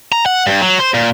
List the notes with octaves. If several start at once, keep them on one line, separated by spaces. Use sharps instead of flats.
A#5
F#5
G2
F#3
C5
A#2